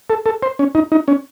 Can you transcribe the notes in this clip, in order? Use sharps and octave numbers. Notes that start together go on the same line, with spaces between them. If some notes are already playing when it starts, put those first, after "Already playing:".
A4
A4
C5
C#4
D#4
D#4
C#4